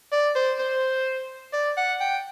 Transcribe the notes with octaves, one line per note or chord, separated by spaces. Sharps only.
D5
C5
C5
D5
F#5
G5